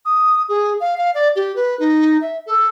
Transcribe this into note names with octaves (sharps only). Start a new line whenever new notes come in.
D#6
G#4
F5
F5
D5
G4
B4
D#4
E5
A4